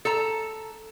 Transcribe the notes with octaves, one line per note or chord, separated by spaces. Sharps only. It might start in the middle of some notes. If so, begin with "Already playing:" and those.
A4 A5 A#5